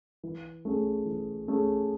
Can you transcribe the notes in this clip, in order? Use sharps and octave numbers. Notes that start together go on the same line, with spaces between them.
E3
A3 C#4 G#4
E3
A3 C#4 G#4